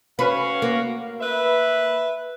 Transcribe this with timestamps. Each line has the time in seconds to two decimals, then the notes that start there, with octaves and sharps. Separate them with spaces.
0.19 C#4 F#4 B4 F5
0.62 A#3
1.21 B4 E5